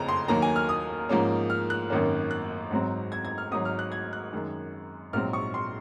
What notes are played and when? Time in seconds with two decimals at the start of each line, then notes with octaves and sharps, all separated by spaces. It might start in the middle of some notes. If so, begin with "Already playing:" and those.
Already playing: F#1 F2 C#3 A#5
0.09 C6
0.28 D#2 D#3 F#3 A#3 A#5
0.42 G#5
0.56 F6
0.69 D#6
1.09 G#2 F3 A#3 C#4
1.50 F6
1.70 F#6
1.90 G#1 F#2 D#3 A#3 C#4
2.31 F#6
2.71 G#1 G#2 F#3 C4
3.12 G#6
3.25 G#6
3.38 F6
3.51 G#1 G#2 F#3 D#6
3.65 F6
3.79 F#6
3.92 G#6
4.13 F#6
4.33 F#2 D#3 G#3
5.13 A#1 G#2 F#3 C4 F6
5.33 C#6
5.54 C6